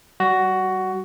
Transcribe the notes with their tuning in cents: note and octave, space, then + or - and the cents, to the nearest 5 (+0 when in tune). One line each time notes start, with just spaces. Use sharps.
G3 -30 F#4 +10